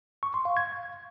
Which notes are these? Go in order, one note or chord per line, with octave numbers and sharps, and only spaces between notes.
C#6
C6
F5
G#6